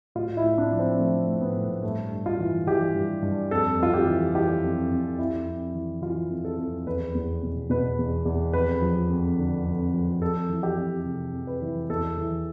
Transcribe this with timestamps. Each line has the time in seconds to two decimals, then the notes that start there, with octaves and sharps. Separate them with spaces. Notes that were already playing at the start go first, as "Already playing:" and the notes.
0.15 A2 F4
0.37 E4
0.44 A2
0.58 D4
0.72 F3
0.79 C4
0.99 F3 A3
1.28 A2
1.41 B3
1.56 A2
1.83 G2 A3
2.11 G2
2.26 F4
2.40 E3
2.67 E3 G4
2.95 G2
3.22 G2
3.51 F2 A4
3.79 F2 F4
3.94 G4
4.07 E3
4.34 E3 G4
4.63 F2
4.91 F2
5.19 F2 E4
5.46 F2
5.74 E3
6.02 E3 F4
6.30 F2
6.45 A4
6.59 F2
6.87 E2 B4
7.15 E2
7.43 B2
7.70 B2 B4
7.99 E2
8.25 E2
8.53 F2 B4
8.82 F3
9.10 F2
9.38 D3
9.66 F2
9.94 F3
10.21 F2 A4
10.49 E3
10.63 G4
10.77 F2
11.05 C3
11.33 F2
11.47 B4
11.62 E3
11.89 E2 A4
12.17 E3